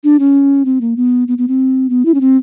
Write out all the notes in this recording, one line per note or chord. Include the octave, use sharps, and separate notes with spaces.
D4
C#4
C4
A#3
B3
B3
B3
C4
B3
E4
C#4
C4